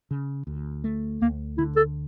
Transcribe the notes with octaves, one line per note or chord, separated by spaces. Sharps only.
C#3
D2
A3
D2 A#3
D3 E4
A4